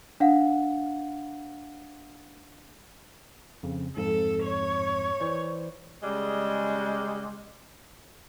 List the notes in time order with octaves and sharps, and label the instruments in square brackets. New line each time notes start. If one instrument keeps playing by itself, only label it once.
[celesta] D4 F5 F#5
[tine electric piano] F2 C#3
[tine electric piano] F2 G#2 [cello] A4
[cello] C#5
[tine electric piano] E3 C5 D5
[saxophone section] C#3 G3 G#3